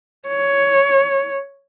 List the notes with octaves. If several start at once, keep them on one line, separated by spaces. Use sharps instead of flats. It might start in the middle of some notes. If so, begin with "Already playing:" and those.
C#5